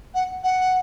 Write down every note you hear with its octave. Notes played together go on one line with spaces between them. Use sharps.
F#5
F#5